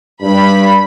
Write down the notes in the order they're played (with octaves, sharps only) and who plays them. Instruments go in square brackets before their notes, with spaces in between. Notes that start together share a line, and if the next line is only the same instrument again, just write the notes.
[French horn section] G2 [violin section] B5